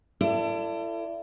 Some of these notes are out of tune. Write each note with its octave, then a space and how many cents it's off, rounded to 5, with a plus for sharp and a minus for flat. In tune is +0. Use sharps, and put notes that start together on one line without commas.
E4 +35 A4 +25 D5 +0